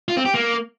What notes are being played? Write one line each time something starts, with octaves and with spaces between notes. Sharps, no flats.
F4
C4
G4
A#3